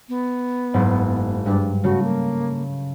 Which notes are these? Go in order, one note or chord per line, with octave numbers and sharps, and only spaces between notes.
B3
F#1 G#2
G2 D4
C#3 A3 F#4
A#3